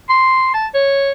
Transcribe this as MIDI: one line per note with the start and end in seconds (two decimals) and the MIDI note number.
0.09 0.53 84
0.54 0.67 81
0.74 1.11 73